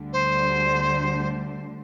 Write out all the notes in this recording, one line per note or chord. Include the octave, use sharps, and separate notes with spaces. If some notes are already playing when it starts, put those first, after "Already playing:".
Already playing: D2 D3 G3
C5